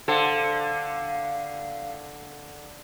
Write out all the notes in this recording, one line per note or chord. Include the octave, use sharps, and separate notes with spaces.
D3 A4 C5 F5